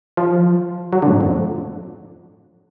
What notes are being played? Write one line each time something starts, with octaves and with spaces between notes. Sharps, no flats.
F3
F#3
D3
A2
G#2
F2